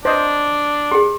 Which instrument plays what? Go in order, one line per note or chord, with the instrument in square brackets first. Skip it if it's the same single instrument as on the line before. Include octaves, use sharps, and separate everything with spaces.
[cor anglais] D4 [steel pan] C5 D#5
[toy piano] G4 G#4